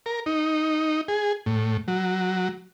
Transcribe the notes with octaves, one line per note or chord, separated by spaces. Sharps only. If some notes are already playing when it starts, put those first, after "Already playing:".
A#4
D#4
G#4
A2
F#3